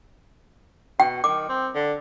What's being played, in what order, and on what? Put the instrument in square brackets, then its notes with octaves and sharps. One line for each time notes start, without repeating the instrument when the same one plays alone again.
[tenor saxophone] B2 [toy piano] G5
[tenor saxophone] D#3 [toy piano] D6
[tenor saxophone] C4
D3